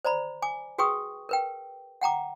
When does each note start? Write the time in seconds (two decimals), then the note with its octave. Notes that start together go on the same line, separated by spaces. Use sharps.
0.05 C5 D5 A#5 B5
0.42 G#5 D6
0.78 F#4 G#4 B4 G5 C#6 D#6
1.29 A#4 B4 G5
2.01 F#5 G5 A#5 D6